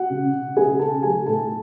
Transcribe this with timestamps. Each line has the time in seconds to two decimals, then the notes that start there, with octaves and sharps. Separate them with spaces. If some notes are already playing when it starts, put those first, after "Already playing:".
Already playing: F#4 F#5
0.10 C#3
0.33 C#3
0.56 C#3 G#4 G#5
0.79 C#3 A4 A5
1.03 F#3 G#4 G#5
1.26 A2 A4 A5